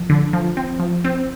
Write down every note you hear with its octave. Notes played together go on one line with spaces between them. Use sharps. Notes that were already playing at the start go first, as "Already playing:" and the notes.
Already playing: F3
D3
F3
C4
F3
C4